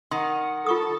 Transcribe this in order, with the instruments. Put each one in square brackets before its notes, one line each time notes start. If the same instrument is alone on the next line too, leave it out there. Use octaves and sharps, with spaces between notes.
[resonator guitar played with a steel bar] D#3 [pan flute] F#5 [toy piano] C6
[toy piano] F4 C#6 D#6 [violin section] A4